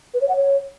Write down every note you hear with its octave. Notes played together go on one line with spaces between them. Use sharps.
B4
C#5
F#5
C#5